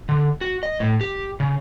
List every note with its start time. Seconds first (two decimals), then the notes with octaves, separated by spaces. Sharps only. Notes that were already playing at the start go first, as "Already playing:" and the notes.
0.09 D3
0.41 F#4
0.63 D#5
0.80 A2
1.01 G4
1.40 C#3